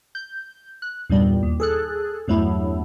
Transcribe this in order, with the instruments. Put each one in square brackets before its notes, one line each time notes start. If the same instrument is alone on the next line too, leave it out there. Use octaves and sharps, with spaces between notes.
[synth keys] G6
F#6
E2 G2 A#2 G3
D#2
G#4 A4 F#6
E2 G2 F#3 A3 E4